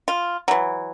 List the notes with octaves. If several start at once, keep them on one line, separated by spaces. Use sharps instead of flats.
F4
E3 F#3